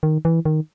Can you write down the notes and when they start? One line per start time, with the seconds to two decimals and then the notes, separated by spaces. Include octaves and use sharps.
0.03 D#3
0.25 E3
0.45 D#3